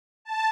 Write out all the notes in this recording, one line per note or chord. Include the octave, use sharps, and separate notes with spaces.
A5